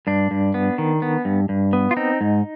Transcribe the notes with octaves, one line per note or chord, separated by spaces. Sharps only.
G2 D4
G2
B3
D#3
B3
G2
G2
B3
F4
C4 D#4
G#2